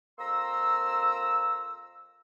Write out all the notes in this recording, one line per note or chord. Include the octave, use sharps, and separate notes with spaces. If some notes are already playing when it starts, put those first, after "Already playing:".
F2 A#3 A#5 C6 E6